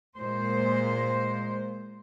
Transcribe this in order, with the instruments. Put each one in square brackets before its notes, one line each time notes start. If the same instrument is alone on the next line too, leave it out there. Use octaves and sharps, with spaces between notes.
[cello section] A#2 G#3 C5